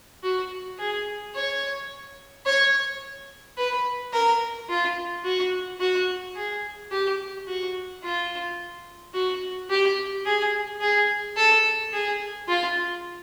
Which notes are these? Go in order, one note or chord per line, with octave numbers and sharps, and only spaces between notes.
F#4
G#4
C#5
C#5
B4
A#4
F4
F#4
F#4
G#4
G4
F#4
F4
F#4
G4
G#4
G#4
A4
G#4
F4